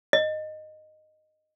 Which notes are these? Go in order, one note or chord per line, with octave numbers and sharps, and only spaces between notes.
D#5